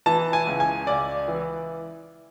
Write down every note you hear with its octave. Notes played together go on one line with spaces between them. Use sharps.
E3 A5
G#5
C#2
G#5
C#2 D5
E3